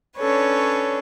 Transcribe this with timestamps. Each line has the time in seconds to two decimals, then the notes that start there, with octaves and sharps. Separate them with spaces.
0.17 C#4 D4 A4 B4 C#5